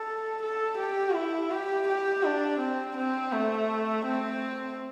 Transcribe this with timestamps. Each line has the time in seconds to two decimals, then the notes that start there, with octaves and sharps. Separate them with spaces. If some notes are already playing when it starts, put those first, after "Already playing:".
Already playing: A4
0.42 A4
0.78 G4
1.14 E4
1.51 G4
1.87 G4
2.23 D4
2.59 C4
2.97 C4
3.32 A3
4.06 C4